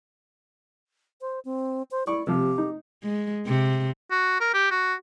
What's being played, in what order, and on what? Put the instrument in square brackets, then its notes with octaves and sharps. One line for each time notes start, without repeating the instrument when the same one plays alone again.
[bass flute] C5
C4
C5
[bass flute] E4 [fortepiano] D5 C#6
[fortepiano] C3 F3 [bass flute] G4
[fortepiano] D#4
[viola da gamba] G#3
C3
[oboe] F#4
A#4
G4
F#4